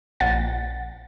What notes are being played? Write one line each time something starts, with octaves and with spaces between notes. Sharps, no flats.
A#1 F#5 A6